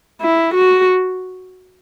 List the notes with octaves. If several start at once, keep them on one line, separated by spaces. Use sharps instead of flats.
E4
F#4